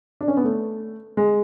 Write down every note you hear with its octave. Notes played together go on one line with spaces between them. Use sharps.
D4
C#4
B3
A3
G#3